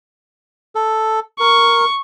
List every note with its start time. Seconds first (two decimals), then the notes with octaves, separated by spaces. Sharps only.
0.75 A4
1.40 A#4 C#6